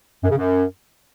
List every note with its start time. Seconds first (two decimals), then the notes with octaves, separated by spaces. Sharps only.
0.23 F#2
0.30 C#3
0.36 F#2